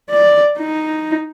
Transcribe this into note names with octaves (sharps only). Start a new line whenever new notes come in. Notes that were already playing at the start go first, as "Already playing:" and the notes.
D5
D#4